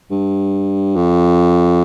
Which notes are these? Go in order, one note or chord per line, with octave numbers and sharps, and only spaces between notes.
G2
F2